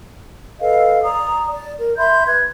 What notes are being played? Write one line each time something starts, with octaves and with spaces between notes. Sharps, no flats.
A4 B4 D#5 F5
D5 A#5 D#6
D5
A#4
E5 B5 C6 G6
B4 F#6 G#6